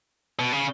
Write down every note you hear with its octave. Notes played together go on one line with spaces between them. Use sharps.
B2
C#3